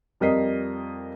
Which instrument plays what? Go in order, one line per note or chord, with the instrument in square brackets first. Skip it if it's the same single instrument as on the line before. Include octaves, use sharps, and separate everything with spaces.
[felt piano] F2 G3 A#4 D#5 B6 C7